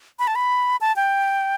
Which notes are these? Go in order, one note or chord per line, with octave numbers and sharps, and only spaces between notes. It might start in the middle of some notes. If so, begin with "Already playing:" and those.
B5
A5
B5
A5
G5